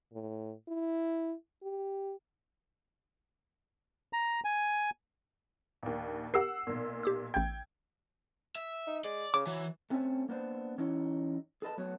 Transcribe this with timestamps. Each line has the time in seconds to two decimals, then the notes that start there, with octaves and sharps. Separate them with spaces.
0.13 A2
0.68 E4
1.63 G4
4.13 A#5
4.44 G#5
5.83 A#1 D#2
6.34 G4 A#4 F#5 E6 C7
6.67 B1 A#2
7.03 G4 D6 E6
7.34 A1 G5 G6 G#6
8.55 E5
8.87 D#4
9.04 G#3 D5
9.34 C#3 D6
9.47 E3 F#3
9.90 A3 C4 C#4 C5 E5 G#5
10.29 A#3 B3 D4 C5
10.78 E3 C#4 D#4 E4 C#5
11.62 G#4 A4 B4 D#5 A5
11.78 F#3 A3 B3 F#4 C#5